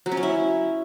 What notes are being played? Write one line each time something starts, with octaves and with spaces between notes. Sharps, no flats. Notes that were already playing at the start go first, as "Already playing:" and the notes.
F#3
C#4
F#3
E4